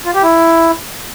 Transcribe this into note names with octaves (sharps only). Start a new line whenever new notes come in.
F4
G4
E4